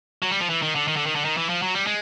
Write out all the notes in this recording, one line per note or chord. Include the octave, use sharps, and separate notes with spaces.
F#3
G3
F3
E3
D#3
D3
D#3
D3
D#3
D3
D#3
E3
F3
F#3
G3
G#3